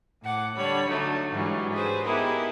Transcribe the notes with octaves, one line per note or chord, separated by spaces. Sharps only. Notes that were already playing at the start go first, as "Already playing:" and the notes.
A2 F#5 D6
D3 G3 C#5 B5
D3 F#3 A3 D#4
G#2 E3 F#3 G3
G#4 B4 C5
B3 D#4 E4 G4 G#4 A#4